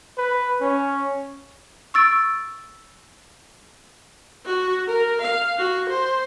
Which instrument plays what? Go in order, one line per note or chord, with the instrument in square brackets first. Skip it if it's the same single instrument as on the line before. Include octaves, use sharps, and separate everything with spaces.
[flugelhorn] B4
C#4
[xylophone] C#6 E6 A6 D7
[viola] F#4
A#4
F5
F#4
C5